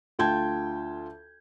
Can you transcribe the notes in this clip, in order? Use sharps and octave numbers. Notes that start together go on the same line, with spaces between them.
D2 F4 G5 A5 G6 G#6